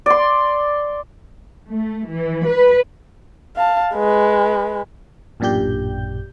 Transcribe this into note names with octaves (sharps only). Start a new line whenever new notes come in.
D5 C6
A3
E3
B4
F5 A5
G#3 B4
A1 F#2 A#2 D4 G4 G6